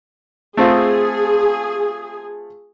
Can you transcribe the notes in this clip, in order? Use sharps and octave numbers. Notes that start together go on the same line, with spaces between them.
A3 C4 F4 G#4